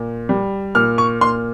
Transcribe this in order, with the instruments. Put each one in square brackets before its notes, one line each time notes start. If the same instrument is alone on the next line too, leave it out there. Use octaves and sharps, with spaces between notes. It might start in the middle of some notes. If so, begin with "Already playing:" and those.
Already playing: [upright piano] A#2
G3
A#2 F6
C#6
A#2 C6